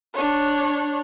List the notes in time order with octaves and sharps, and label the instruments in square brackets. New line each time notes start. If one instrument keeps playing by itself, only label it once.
[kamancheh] D4 C#5